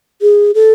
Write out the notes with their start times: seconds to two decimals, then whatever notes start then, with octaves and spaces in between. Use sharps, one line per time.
0.22 G#4
0.55 A4